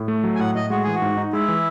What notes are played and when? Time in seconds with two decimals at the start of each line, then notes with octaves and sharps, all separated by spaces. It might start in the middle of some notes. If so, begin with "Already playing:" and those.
Already playing: A2
0.08 A3
0.23 F#3
0.35 G#5
0.39 A2 F#5
0.55 A2 D#5
0.70 G#3 F#4
0.83 E3 G#4
0.95 F#4
1.02 G#2
1.18 D#4
1.33 G#3 E4
1.48 E3